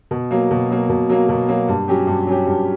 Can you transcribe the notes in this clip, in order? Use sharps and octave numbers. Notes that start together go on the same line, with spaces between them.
B2
F#3 A#3
B2
F#3 A#3
B2
F#3 A#3
B2
F#3 A#3
G2
F#3 C#4 G4
G2
F#3 C#4 G4
G2